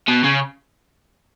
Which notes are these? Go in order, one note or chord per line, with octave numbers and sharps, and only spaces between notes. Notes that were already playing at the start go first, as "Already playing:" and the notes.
B2
C#3